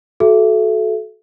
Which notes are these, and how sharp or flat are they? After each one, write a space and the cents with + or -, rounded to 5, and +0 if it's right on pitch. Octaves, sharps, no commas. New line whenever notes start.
F#4 +0 A4 -25 E5 +25